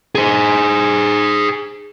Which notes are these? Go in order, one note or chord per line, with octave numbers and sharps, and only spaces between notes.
G#4 C5